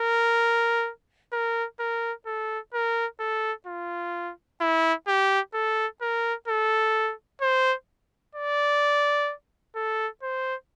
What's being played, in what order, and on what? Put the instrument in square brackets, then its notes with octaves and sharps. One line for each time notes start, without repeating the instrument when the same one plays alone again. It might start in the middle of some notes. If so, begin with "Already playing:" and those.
Already playing: [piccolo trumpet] A#4
A#4
A#4
A4
A#4
A4
F4
E4
G4
A4
A#4
A4
C5
D5
A4
C5